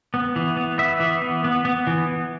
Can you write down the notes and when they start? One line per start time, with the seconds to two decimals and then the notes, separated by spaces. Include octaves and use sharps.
0.14 B3
0.36 E3
0.57 B3
0.78 B3 E5
1.00 E3
1.22 B3
1.44 B3
1.65 B3
1.87 E3